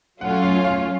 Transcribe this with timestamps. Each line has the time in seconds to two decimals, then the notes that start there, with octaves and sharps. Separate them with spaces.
0.21 F#3 A3 C#4 F4 F#5
0.43 F5
0.65 F5